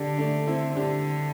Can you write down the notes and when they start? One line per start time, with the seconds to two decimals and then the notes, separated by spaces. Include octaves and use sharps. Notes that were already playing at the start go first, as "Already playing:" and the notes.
Already playing: D3 D4 G4
0.18 A3 D4
0.47 C4 E4
0.76 D3 D4 G4